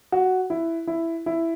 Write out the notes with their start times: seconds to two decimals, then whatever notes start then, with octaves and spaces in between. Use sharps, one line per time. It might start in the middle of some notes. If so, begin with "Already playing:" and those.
0.12 F#4
0.50 E4
0.87 E4
1.26 E4